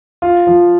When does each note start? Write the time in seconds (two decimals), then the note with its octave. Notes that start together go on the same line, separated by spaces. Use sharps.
0.22 F4
0.47 F3